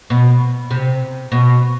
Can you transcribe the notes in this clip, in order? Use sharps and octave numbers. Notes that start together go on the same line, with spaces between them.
B2
C3
B2